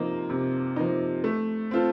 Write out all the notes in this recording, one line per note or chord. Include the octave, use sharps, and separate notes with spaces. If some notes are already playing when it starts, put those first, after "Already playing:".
Already playing: C3 F3 A#3 D#4
C3
F3 A#3 D#4
A3
C4 F4 A4